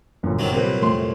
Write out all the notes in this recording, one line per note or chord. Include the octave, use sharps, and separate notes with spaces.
G1 F#2 A#2
C3 D#3 F#3
C2 F#2 A#2 C4 G4 B4
F2 A3 C6